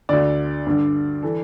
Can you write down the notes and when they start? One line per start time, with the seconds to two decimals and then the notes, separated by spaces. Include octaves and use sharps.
0.09 D2 D3 D5
0.67 G2 D3
1.22 E3 A4